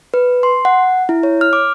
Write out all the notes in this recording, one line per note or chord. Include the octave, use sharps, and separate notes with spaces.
B4
C6
F#5
E4
C#5
F6
D6